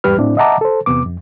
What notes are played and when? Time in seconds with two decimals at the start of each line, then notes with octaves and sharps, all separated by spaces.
0.04 E2 G#2 G3 G4 B4 F6
0.18 A2 C4 D4 E4 D5
0.37 D#5 E5 F#5 A5 A#5 D6
0.61 A4 C5
0.86 E2 C3 B3 D6
1.06 F2